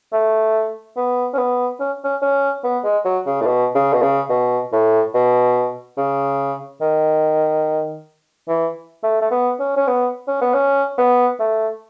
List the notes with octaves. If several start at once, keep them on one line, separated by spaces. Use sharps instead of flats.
A3
B3
C#4
B3
C#4
C#4
C#4
B3
G#3
F#3
C#3
A2
B2
C#3
B2
C#3
B2
A2
B2
C#3
D#3
E3
A3
A3
B3
C#4
C#4
B3
C#4
B3
C#4
B3
A3